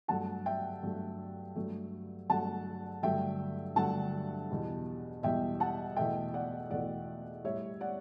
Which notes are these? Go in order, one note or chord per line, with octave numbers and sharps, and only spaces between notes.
G2 F#3 A3 F#5 A5
E5 G5
G2 F#3 A3
G2 F#3 A3
G2 F#3 A3 F#5 A5
G2 D3 F#3 A3 E5 G5
G2 D3 F#3 A3 F#5 A5
E2 B2 G3
E2 B2 G3 E5 G5
F#5 A5
E2 B2 A3 E5 G5
D5 F#5
E2 B2 A3 D5 F#5
A2 G3 C#5 E5
D5 F#5